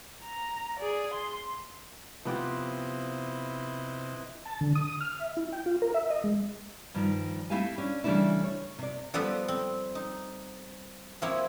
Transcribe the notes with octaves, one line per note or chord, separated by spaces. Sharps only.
A#5
G#4 D5
C6
C3 F3 B3 E4 G4 B4 D#5
A5
D3
D#6
F6
E5
E4
G5
F4
A#4
E5
D#5
G#3
G2 D#3 F3
A3 C4 E4 G4 F5 G#5
C#4 D4
C#3 E3 G3 A3 D4 E4
C#5
C3 D5
F3 G3 B3 G4 A4 B4
C4
D#4
F3 A#3 C4 E4 C#5